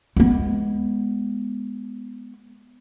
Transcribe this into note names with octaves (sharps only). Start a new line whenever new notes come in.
G#3 B3